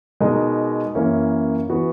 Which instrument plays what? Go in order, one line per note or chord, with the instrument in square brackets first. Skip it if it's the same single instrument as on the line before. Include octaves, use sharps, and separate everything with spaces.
[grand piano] B2 G#3 D#4 A#4 D#5
F#2 E3 A#3 C#4 E4
E3 B3 F#4